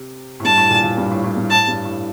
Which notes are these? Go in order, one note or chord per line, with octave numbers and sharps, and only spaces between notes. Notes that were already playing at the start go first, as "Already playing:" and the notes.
Already playing: C3
A2
G2 A5
A2
A#2
A#2
G2
A2
A2
G2
A2 A5
G2
A2